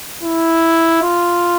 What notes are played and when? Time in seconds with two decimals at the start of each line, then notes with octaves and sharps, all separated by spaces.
0.23 E4
1.02 F4